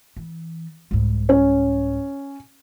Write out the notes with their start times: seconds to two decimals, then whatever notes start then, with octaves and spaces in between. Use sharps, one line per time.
0.17 E3
0.91 C2 G#2
1.29 C#4